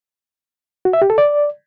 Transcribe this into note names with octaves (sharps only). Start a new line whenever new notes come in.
F#4
E5
G4
A4
D5